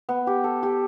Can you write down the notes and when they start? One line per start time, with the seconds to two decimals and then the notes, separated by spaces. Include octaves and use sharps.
0.09 B3
0.27 G4
0.44 A4
0.63 G4